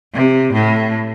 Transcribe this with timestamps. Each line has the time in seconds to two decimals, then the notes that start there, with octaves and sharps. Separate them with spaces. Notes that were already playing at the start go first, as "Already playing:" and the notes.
0.14 C3
0.52 A2